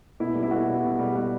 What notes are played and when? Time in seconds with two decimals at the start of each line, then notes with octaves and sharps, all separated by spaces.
0.20 B2 E4
0.35 G3
0.43 E4
0.51 B2 F#4
0.68 G3
0.84 B2
0.99 G3
1.15 B2 F#4